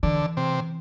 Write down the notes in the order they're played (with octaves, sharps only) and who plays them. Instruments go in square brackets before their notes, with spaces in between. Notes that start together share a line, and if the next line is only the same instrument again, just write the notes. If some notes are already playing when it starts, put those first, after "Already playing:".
[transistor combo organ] D3 [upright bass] E3
[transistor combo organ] C3